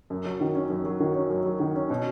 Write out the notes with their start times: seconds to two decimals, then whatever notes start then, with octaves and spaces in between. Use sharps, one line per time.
0.10 F#2
0.25 F#3
0.41 D#3
0.55 C#4
0.70 F#2
0.85 F#3
1.00 D#3
1.15 C#4
1.30 F#2
1.46 F#3
1.60 D#3
1.75 C#4
1.90 B2